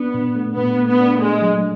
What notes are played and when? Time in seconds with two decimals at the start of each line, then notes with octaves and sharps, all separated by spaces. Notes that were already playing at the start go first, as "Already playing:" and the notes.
Already playing: B3 D4
0.14 A#2
0.36 A3
0.56 A#2 B3
0.79 A3
0.88 B3
1.00 D4
1.21 G#3 A3
1.42 F#3